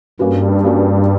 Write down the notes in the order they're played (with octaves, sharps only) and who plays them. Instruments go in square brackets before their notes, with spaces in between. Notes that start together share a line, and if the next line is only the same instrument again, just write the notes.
[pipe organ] G2 [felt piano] G3 A#3 C#4 F#4 B4
[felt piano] G3 A#3 C#4 F#4 B4